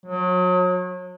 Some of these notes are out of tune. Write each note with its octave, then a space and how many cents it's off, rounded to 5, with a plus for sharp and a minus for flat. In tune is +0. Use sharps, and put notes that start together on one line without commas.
F#3 -35